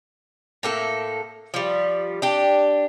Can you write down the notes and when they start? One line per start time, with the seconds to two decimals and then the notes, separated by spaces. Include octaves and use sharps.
0.63 A2 A#3 A4
1.54 F3 G3
2.22 D4 G4